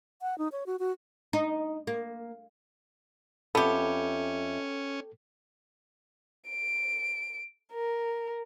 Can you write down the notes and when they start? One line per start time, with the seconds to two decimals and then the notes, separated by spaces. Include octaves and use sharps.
0.22 F#5
0.38 D#4
0.52 C#5
0.66 F#4
0.79 F#4
1.33 D#4
1.87 A#3
3.55 F2 B3 C#4 G4 A4 E5
6.50 D7
7.73 A#4